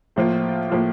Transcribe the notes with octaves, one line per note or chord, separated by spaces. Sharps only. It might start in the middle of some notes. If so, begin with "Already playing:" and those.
A2 F3 A#3 F4
A2 F3 A#3 F4